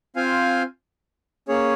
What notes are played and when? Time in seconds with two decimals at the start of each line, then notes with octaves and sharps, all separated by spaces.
0.16 C4 F4 C5 F5 G#5
1.49 A#3 C#4 G#4 C#5